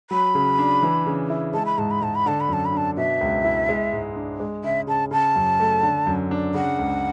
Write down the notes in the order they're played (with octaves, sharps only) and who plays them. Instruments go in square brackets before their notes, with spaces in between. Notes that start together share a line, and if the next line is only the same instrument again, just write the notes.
[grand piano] F#3 [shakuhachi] B5
[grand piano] C#3
D4
E3
C#3
E4
[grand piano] G#3 [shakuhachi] A5
[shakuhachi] B5
[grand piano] G#2 [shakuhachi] A5
[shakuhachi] B5
[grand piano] G#2 [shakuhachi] A5
[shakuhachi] B5
[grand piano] D3 [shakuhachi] A5
[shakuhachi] B5
[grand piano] F#2 [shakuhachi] A5
[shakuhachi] B5
[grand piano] D4 [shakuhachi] A5
[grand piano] B2 [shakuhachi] E5
[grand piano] C#2
E4
G#3
G#2
D4
G#3
[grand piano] C#3 [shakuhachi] E5
[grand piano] C#3 [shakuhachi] A5
[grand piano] C#3 [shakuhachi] A5
[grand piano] F#2
A3
D3
F#2
D4
[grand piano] C#3 [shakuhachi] F#5
[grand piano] C#2